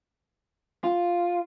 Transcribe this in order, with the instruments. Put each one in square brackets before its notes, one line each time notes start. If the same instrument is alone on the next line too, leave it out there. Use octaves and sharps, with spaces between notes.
[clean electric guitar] F4